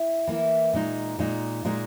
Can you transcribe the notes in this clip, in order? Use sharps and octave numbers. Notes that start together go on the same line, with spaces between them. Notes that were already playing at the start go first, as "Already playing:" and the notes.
Already playing: E4
E3 A#3 E4
A#2 G#3 D#4
A#2 G#3 D#4
A#2 G#3 D#4